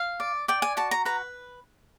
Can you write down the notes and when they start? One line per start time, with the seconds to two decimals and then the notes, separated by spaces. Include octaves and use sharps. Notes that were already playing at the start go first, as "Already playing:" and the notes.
Already playing: F5
0.20 D5
0.48 D5 G5
0.62 G#5
0.77 F#4 A5
0.91 A#5
1.05 B4 A#5